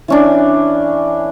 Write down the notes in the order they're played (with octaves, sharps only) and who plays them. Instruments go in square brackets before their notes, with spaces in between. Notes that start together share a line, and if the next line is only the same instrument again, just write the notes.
[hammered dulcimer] E3 C#4 D4